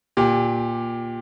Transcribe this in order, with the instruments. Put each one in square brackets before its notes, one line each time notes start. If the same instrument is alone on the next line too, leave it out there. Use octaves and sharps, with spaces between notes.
[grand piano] A#2 G4